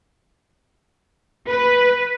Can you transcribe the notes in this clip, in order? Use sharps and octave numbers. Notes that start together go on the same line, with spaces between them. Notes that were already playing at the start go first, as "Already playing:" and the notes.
B4